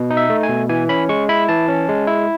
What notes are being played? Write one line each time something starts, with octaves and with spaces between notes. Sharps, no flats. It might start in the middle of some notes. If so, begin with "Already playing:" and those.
Already playing: B2
D#4
E5
A3
G#5
B2
E3 G#5
C#4 B5
G#3 C#6
E4 B5
E3 A5
C#4
G#3
E4